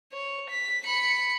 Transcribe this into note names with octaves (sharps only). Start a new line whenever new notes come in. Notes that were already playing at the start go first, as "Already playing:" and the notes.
C#5
B6
B5 C#7